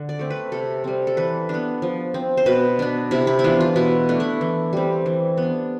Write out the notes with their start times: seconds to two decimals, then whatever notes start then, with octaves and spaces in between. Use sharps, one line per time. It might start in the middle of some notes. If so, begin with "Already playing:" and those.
Already playing: D3
0.09 D5
0.19 A3 C4
0.30 B4
0.52 C3 A4
0.84 G3 C4
1.07 A4
1.17 E3 B4
1.49 B3 D4
1.82 F3
2.14 C4
2.37 C5
2.46 B2 B4
2.79 B3 D4
3.11 C3 E4
3.27 E4
3.39 E4
3.44 E3 B3 D4 F4
3.60 F4
3.76 B2 E4
4.09 A3 D4
4.20 E4
4.41 E3
4.73 G3 C4
5.06 E3
5.37 B3 D4